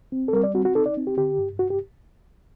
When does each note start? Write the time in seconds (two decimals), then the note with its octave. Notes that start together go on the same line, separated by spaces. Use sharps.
0.12 C4
0.28 A4
0.33 G3 A#4
0.44 D5
0.54 C4 F#4
0.65 F#4
0.75 D#4 A4
0.86 D5
0.97 C4
1.07 G4
1.17 D3 G4
1.38 G2
1.59 G2 F#4
1.70 G4